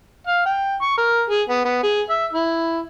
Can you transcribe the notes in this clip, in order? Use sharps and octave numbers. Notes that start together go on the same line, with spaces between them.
F5
G5
C#6
A#4
G#4
B3
B3
G#4
E5
E4